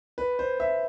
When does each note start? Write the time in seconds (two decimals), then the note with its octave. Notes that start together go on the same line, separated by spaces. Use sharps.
0.18 B4
0.39 C5
0.60 E5